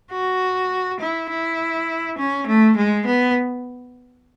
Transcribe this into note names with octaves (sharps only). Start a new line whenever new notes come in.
F#4
E4
E4
C#4
A3
G#3
B3